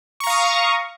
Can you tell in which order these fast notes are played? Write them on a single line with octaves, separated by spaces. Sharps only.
C#6 A#5 F5 D#6